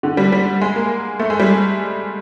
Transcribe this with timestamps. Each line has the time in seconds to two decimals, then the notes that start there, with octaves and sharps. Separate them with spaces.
0.03 D3
0.17 G3
0.32 G3
0.61 G#3
0.76 A#3
1.19 A3
1.30 G#3
1.39 G3